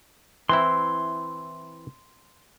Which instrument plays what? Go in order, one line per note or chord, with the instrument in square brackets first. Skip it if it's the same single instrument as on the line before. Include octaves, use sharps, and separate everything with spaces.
[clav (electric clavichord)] E3 C4 E4 [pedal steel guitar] C6